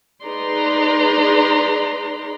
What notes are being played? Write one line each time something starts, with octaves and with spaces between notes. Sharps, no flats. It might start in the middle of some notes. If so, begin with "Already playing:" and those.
D#4 G#4 B4 D5 A#5 C6